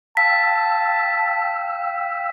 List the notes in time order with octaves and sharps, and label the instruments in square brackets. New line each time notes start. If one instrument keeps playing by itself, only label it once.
[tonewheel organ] F5 G5 E6 [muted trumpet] A5 [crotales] B6